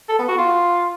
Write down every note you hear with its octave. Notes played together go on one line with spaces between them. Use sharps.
A4
B3
F#4
F4